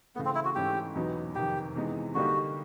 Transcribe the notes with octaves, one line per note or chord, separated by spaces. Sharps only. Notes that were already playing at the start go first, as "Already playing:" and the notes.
C#3 E3 A3 B3
C4
E4
F#4
G#2 E3 A3 C#4 G4
E2 B2 F#3 B3 D#4
F2 C3 D#3 G4
C3 E3 G#3 B3 D#4
D3 G3 A#3 D#4 F#4 G4